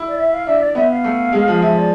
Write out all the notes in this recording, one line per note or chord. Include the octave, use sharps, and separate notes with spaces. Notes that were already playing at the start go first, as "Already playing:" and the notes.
Already playing: E4
D5
E5
F5
D4 E5
D4 D5
B3 E5
F5
A3
G#3
F3
F3 E5
D5